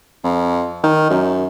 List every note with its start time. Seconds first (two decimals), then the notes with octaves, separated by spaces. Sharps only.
0.24 F2
0.83 D#3
1.10 F#2